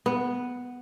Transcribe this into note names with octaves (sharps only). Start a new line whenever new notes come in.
B3